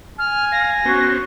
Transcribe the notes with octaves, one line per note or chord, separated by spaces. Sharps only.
G#5 F6
F5 A#6
B3 C#4 F#4 C5